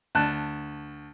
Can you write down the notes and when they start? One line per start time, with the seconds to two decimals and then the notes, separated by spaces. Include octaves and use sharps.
0.15 D2 A5 F#6